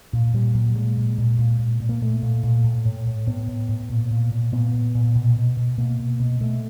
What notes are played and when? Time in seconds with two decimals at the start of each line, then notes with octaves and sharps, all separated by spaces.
0.13 A#2
0.34 A#2 G3
0.55 A#2 F#3
0.76 A#2 G#3
0.97 A#2
1.18 A#2
1.39 A#2
1.59 A#2
1.80 A#2
1.89 A#3
2.01 A#2 A3
2.23 A#2
2.43 A#2
2.64 A2
2.85 A2
3.07 A2
3.27 A2 B3
3.48 A2
3.69 A2
3.90 A#2
4.11 A#2
4.31 A#2
4.52 A#2 B3
4.74 A#2
4.95 A#2
5.15 B2
5.37 B2
5.57 B2
5.78 B2 A#3
6.00 B2
6.20 B2
6.41 B2 A3